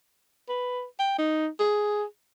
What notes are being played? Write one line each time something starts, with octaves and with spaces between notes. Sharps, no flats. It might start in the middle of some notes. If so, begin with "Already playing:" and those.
B4
G5
D#4
G#4